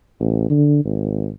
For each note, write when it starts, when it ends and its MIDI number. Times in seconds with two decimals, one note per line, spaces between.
0.20 0.45 33
0.50 0.84 50
0.85 1.29 32